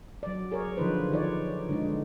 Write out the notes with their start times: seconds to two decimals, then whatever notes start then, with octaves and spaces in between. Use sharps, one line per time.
0.23 F#3 D5
0.52 G#4 A#4 C#5
0.77 D3 F3 D#4 B4 C5
1.10 D#3 D#4 C#5 D5
1.69 D3 G#3 D#4